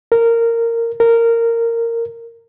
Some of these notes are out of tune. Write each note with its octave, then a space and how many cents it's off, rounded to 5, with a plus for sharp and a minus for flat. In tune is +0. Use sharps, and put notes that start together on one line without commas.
A#4 -15
A#4 -15